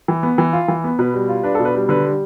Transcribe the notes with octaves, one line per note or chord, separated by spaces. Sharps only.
E3
B3
E3
F4
E3
B3
B2 B4
G3
F4
D4 B4
B2 A4
B4
G3
D3 B4
G3